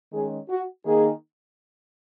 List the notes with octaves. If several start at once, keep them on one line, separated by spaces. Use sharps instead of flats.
D#3 G#3 C#4 G#4
F#4
D#3 A#3 D#4 G#4